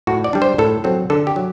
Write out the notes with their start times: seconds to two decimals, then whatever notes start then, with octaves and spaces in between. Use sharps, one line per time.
0.07 A2 F#4
0.24 D5
0.33 G3 D4
0.42 C5
0.58 A2 A4
0.84 F#3 C4 A4
1.10 D3 A4
1.27 G4
1.36 F#3